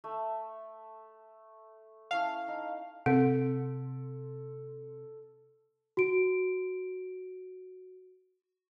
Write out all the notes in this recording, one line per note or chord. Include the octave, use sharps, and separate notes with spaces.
A3 E5
C#4 E4 F5 A5
D#4
C3 C4 A4
F#4 D7